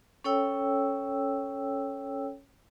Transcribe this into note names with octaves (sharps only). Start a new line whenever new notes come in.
C#4 A4 C#5 G5 E6